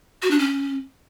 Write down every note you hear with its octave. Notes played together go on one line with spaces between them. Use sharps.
F#4
D4
C#4